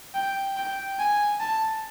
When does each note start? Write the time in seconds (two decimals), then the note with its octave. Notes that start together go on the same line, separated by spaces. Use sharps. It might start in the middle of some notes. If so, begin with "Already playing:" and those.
0.15 G5
0.57 G5
0.99 G#5
1.41 A5